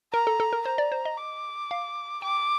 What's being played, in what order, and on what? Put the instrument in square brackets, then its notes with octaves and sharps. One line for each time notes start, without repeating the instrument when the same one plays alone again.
[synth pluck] A#4 [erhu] A#5
[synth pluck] A4
A4
A#4
[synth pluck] C5 [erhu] A#5
[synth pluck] D5
C5
D#5
[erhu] D6
[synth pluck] F5
[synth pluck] G5 [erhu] D6